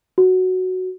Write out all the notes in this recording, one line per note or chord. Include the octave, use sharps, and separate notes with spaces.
F#4